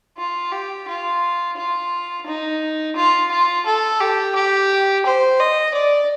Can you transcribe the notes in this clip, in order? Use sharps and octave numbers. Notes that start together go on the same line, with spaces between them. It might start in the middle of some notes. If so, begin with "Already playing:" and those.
F4
G4
F4
F4
D#4
F4
F4
A4
G4
G4
C5
D#5
D5